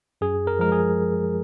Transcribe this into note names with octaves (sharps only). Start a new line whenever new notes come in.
F#2 G#4
A#4
F3 G#3 A#4
G#4